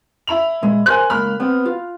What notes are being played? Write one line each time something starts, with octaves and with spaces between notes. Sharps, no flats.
E4 B5 F7
A#2 G#3
A#4 C5 G#5 F#6
C#2 A#3 B5 F6
B3 C4
F4